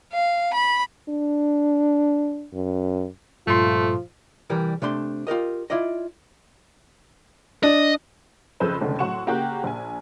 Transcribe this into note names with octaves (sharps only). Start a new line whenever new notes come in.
F5
B5
D4
F#2
G2 A#2 F3 A3 F4 C6
C2 E3 G3 A#4
C3 A3 D4 C6
F4 G4 A#4 D#5
E4 F4 D5 D#5
D4 D#5
F2 C#3 A3 B4 C5
F1 C#2 D3 C#4
A2 F#3 F#5 C6 C#6 E7
C#3 A#3 F#4 G4 G5 F#6
A#1 G#5